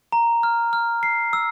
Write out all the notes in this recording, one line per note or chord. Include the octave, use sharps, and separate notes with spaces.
A#5
F6
F6
C7
E6